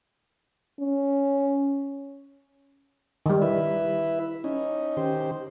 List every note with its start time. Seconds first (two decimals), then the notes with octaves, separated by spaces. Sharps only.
0.80 C#4
3.26 D#3 G3
3.42 E4 B4 E5
4.44 C#4 D#4
4.97 D#3 G4 C5